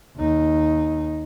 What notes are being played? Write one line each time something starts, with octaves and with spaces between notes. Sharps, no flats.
D#2 D#4